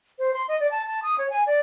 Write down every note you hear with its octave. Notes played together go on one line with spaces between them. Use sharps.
C5
C6
D#5
D5
A5
A5
D#6
C#5
G#5
D5